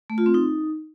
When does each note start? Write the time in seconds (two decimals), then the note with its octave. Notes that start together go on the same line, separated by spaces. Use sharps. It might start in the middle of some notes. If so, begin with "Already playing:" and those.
0.10 A3
0.18 F4
0.26 C4
0.34 D#4